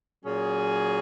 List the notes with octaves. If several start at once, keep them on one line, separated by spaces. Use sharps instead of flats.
A#2 F#3 C#4 G#4